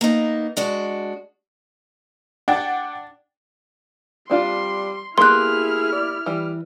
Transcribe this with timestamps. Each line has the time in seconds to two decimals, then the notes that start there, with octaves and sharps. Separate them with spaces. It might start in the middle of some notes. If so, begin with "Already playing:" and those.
0.01 A#3 B3 D#4
0.57 G#3 D4 F#4
2.48 D4 F#5 G5 A6
4.30 G3 C4 D4 F4 C6
5.18 A#3 B3 E4 G4 G#4 C6 F6 F#6
5.92 D5
6.26 E3 G3